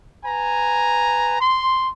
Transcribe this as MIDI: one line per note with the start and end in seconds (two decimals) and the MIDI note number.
0.25 1.37 71
0.25 1.37 80
0.25 1.37 82
1.41 1.89 84